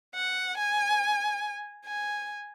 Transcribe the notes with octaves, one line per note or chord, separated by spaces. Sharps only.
F#5
G#5
G#5